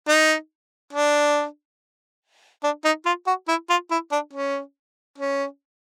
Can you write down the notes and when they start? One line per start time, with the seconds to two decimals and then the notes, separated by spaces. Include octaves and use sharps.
0.08 D#4
0.93 D4
2.63 D4
2.84 D#4
3.05 F4
3.27 F#4
3.48 E4
3.70 F4
3.91 E4
4.12 D4
4.33 C#4
5.18 C#4